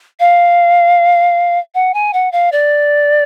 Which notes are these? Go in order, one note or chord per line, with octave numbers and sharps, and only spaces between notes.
F5
F#5
G#5
F#5
F5
D5